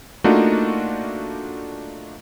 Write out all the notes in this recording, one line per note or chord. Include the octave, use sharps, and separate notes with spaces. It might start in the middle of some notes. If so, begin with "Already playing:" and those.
A3 A#3 D4 D#4 F4 F#4